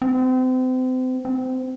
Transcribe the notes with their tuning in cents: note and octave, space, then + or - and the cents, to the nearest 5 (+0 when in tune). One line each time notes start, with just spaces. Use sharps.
C4 -35
C4 -25